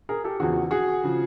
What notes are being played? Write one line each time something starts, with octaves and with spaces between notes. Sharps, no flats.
G#4 A#4
G4 A4
E2 C#3 F3 F#4 G#4
F#4 G#4
C#3 F3